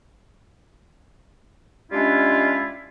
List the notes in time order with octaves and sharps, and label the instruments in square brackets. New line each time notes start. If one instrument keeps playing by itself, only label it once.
[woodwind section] G3 G#3 C#4 D4 E4 F4